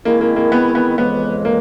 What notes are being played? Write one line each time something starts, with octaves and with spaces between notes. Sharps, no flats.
D#3 G#3 A#3 C4 E4
A#3
A#3
B3
B3
F2 C#3 E3 G#3 B3
A#3